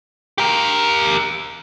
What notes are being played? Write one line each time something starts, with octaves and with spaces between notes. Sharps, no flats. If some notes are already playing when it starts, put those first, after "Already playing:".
G4 A#4